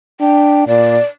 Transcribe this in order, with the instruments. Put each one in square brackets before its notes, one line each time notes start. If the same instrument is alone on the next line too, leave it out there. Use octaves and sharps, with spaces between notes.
[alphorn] D4 [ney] G5
[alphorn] A#2 [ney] D5